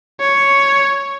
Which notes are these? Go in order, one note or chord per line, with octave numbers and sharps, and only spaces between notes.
C#5